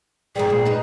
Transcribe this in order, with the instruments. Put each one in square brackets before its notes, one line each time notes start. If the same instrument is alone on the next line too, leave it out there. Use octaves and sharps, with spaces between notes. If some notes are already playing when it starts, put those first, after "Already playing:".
[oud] G#2 F3 G3 [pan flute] G#4
[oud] A#2
D#4 B4